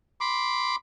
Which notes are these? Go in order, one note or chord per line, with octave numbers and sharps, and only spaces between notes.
B5 C6 D6